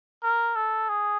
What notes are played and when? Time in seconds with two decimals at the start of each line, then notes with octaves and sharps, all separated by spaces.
0.23 A#4
0.56 A4
0.89 G#4